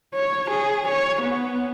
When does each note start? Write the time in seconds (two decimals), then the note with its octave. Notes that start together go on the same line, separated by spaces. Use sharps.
0.14 C#5
0.50 G#4
0.88 C#5
1.21 B3